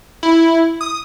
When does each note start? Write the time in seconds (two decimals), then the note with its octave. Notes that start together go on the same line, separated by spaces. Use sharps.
0.23 E4
0.81 D#6